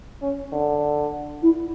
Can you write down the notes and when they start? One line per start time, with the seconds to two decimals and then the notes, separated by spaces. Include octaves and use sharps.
0.22 C#4
0.53 D3
1.43 E4